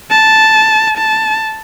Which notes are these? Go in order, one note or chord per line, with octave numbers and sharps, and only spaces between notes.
A5
A5